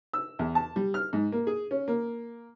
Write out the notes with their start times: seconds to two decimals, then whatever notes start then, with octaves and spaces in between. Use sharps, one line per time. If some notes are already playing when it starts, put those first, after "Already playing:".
0.13 E6
0.39 E2
0.55 A5
0.76 G3
0.94 F6
1.13 G#2
1.32 A#3
1.47 G#4
1.71 C#4
1.88 A#3